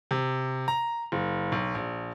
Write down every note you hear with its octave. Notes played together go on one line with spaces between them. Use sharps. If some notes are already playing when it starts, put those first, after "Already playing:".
C3
A#5
F#1
B1
A#1